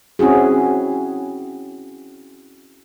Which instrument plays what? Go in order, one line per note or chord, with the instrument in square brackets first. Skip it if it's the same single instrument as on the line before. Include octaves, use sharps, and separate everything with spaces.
[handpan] C4 C#4 E4 F#4 G#4